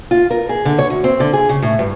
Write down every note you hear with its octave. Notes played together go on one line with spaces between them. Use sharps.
F4
A#4
G#4
D3
C#5
D2
C4
D3
G#4
C#3
A2
G2